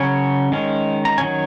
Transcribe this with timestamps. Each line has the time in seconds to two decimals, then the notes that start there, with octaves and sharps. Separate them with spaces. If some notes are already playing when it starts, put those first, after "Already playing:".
Already playing: C#3 F#3 C#4 G#5
0.52 D#3 G#3 C#4
1.05 A#5
1.18 D#3 F#3 C#4 G#5